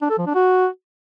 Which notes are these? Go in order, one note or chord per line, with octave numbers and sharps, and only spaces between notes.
D4
A4
F3
D4
F#4